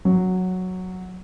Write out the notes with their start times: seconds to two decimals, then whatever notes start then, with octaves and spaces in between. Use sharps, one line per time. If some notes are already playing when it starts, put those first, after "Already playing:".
0.05 F#3